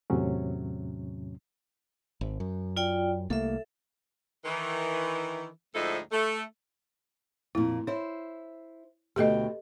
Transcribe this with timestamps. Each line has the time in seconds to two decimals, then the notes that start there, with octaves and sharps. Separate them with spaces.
0.10 E2 A2 C3 F#3 C#4
2.21 G#1
2.40 F#2
2.77 F4 D5 G5
3.30 C2 A3 A#3 A4 E5
4.45 D#3 E3
5.74 D2 G#2 F3 D#4 E4 A4
6.12 A3
7.55 F2 A#2 E4
7.87 E4 C5 C#5
9.16 D2 B2 G4 A4 D#5 G5